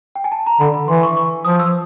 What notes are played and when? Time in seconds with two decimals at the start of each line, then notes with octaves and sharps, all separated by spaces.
0.15 G5
0.24 G#5
0.32 A5
0.46 A#5
0.60 D3 B5
0.74 B5
0.88 E3 C6
1.03 C#6
1.16 C#6
1.45 F3 D#6
1.59 E6